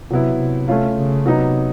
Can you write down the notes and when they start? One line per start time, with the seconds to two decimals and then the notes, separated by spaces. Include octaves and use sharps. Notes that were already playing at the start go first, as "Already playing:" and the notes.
0.10 C3 F#3 B3 E4
0.39 C3
0.68 A3 C#4 F4
0.96 C#3
1.26 C3 F#3 B3 D#4